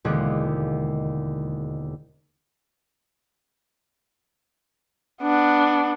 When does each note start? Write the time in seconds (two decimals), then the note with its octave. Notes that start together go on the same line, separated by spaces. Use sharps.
0.05 E1 D#2 D3 G#3 F#6
5.22 B3 D4